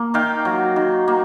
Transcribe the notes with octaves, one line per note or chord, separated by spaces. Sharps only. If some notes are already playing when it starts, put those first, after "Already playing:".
Already playing: A#3
D#3 F5 G5
F#3
D#3
A#3